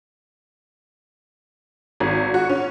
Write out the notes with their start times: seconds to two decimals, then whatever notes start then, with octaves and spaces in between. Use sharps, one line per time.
2.00 G#1
2.34 F#4
2.50 C#4